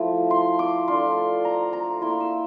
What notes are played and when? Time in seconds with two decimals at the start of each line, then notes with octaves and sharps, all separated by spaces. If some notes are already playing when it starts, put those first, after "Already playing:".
Already playing: F3 A3 E4
0.31 C6
0.59 D6
0.88 A3 D4 F4 C6
1.45 A#5
1.73 A#5
2.01 A#3 E4 C6
2.20 E6